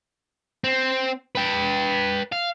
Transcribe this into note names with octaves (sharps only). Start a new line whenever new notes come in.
C4
B4 G5
F5